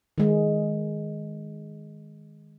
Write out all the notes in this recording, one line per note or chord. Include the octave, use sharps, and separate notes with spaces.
D#3 G#3